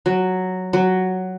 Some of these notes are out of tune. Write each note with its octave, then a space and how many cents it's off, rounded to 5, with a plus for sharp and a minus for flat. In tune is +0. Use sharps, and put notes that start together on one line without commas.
F#3 +0
F#3 +5